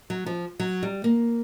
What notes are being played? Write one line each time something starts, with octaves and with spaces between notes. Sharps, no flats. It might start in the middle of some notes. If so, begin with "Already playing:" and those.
F#3
F3
F#3
G3
A#3